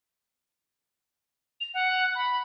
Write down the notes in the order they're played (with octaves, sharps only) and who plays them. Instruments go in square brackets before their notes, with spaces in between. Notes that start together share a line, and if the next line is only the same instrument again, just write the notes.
[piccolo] F7
F#5
B5